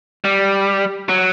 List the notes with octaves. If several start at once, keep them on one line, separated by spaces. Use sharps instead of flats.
G3
F#3